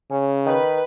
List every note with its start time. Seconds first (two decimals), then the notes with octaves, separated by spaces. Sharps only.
0.11 C#3 C#4
0.46 D#3 B4